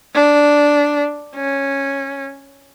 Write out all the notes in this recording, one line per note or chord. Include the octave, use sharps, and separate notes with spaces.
D4
C#4